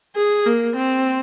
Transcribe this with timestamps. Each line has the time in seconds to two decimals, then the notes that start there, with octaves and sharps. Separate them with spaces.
0.16 G#4
0.46 A#3
0.77 C4